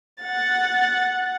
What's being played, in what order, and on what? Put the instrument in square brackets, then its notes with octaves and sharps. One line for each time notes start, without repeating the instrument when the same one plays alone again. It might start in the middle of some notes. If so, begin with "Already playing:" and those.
[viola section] F#5 [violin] A6